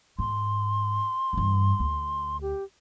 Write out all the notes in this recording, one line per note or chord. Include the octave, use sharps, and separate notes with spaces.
G#2 C6
G2 E3
D2
G4